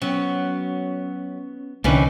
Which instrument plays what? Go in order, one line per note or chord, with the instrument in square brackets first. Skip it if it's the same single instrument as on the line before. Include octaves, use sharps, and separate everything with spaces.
[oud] F#3 [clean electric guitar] B3 C#4
[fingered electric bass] C2 D3 [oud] E3 C#4 [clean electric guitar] A#3 D#4 B4